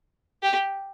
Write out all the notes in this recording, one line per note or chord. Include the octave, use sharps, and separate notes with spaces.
G4